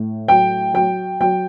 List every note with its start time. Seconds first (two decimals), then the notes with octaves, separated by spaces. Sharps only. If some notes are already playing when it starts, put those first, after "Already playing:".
Already playing: A2
0.28 F#3 G5
0.74 F#3 G5
1.20 F#3 G5